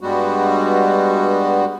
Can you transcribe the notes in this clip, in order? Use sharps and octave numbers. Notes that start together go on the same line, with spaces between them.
G2 G3 G#3 B3 F#4